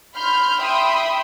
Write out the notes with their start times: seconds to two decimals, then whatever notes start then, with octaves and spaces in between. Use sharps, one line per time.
0.15 B5 C6 F6 G6
0.59 E5 G5 B5 C6 D#6 E6